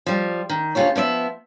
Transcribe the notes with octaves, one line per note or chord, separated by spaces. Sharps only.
F3 G3
D#3
D2 C#3 F3 F4 G4 C#5
F3 B3 D5 E5